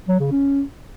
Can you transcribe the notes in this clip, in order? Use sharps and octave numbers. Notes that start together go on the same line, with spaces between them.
F#3
C#3
C#4